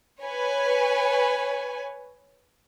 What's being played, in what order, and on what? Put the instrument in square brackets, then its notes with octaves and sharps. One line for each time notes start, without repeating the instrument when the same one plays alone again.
[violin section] B4 C#5 G#5